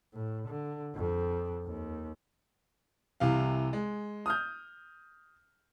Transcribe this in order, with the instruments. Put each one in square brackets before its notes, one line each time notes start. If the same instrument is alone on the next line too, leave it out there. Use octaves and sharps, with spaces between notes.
[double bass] A2
D3
F2
D#2
[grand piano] C2 C3 E3 F5
G#3
D#6 F6 G6